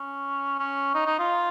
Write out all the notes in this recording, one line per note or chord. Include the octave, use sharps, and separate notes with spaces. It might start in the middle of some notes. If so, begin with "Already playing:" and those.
Already playing: C#4
C#4
D#4
D#4
F4